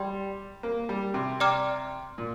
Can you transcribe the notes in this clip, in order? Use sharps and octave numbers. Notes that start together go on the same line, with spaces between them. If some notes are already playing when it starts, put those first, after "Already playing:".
Already playing: G3 D5 G5 C6
A#3
G3
C3
D5 G5 A#5 D6 F6
A#2